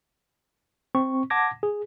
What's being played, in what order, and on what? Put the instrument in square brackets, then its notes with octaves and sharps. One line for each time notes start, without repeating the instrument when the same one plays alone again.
[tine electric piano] C4 C#6
F#5 A5 D6 G#6 A#6
G#4